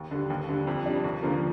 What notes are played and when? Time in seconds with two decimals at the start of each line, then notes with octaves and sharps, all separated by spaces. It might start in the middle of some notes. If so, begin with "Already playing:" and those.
Already playing: D#2
0.11 D3 G3
0.30 D#2
0.49 D3 G3
0.67 F2
0.86 C3 G3 D4
1.04 D#2
1.23 D3 F3 A#3